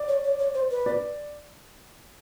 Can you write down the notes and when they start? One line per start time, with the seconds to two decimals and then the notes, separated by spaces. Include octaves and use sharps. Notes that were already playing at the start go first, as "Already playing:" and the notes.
Already playing: D5
0.08 C#5
0.24 C#5
0.39 C#5
0.55 C5
0.71 B4
0.86 D5